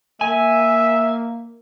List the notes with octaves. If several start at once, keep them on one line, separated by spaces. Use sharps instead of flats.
A#3 E5 G#5